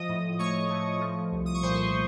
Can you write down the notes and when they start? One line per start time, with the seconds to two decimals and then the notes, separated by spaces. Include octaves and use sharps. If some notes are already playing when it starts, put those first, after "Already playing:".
Already playing: F3 D#5 D#6
0.09 A2
0.39 A3 C#5 C#6
0.70 A3
1.01 F3
1.32 C2
1.46 D#6
1.54 C#6
1.62 A#2 C5 C6